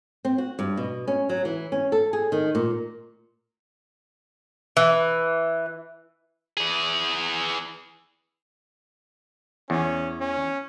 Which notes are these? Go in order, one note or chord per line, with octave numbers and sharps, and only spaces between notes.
C4
F#4
G2
B2
C#4
F#3
E3
C#4
A4
G#4
D#3
A#2
E3
E3 G#4
E2 C#4
C#4